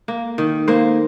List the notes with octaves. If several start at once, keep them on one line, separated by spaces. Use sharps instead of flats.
A#3
D#3
A#3 C5